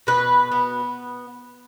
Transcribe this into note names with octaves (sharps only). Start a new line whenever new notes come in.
B2 B4
B3